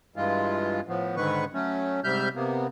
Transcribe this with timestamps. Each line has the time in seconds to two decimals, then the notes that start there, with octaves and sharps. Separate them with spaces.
0.16 G2 E3 G#3 F4
0.88 A2 F3 B3
1.17 G#2 D3 D#3 G#3 B4 C#6
1.54 F#3 A3 C#4
2.04 G#2 C3 G3 E5 F6 G6
2.35 C3 A#3 B3